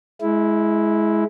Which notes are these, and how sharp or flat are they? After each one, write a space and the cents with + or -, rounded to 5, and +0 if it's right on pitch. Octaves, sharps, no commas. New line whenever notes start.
G#3 +25 E4 -5